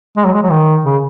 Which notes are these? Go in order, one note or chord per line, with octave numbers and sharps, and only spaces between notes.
G#3
F#3
G#3
F#3
D#3
C#3